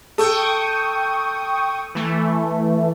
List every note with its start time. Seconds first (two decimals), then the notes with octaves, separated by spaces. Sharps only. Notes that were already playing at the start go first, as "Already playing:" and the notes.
0.18 A4 G5 C#6 D#6
1.95 E3 A3